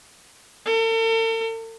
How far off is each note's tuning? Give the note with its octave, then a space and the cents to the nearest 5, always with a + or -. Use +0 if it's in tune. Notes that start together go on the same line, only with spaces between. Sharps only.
A4 +45